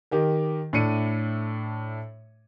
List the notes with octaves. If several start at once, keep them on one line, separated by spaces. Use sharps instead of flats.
D#3 G4 A#4
A2 A3 D4 C#7 D#7